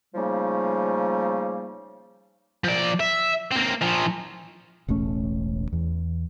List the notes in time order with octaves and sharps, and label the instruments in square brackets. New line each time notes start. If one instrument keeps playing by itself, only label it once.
[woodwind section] C#3 F3 G3 A3 A#3 D#4
[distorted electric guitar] F3 D5
E5
A#3 C4
A#2 F3
[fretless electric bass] E1 A1 A3 C#4
E2